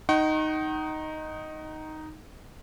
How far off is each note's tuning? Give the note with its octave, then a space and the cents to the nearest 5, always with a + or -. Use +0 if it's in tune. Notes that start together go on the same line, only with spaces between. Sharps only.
D#4 +0 F#5 +45 C#6 -45